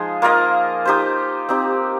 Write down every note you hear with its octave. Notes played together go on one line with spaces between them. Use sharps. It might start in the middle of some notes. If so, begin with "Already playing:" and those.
Already playing: F3 G#3 D#4 G#4
A#3 F4 A#4 D#5
D#4 G4 C5
C4 D#4 G4